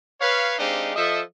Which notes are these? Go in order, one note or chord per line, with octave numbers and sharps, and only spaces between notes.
B4 C#5 F5
G#3 C4 D4 D#4 G4 F5
F3 A4 D#5 E5